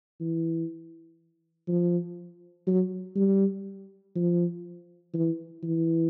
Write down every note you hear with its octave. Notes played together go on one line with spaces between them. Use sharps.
E3
F3
F#3
G3
F3
E3
E3